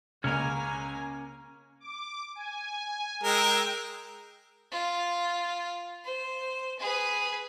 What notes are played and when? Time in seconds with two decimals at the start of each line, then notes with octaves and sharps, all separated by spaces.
0.24 C#2 A#3 C#4 A#4 G#5
1.80 D6
2.35 G#5
3.23 G#3 A#4 G5 E6 D7
4.72 F4
6.04 C5
6.79 G#4 B4